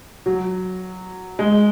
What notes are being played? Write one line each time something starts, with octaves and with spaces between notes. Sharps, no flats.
F#3
G#3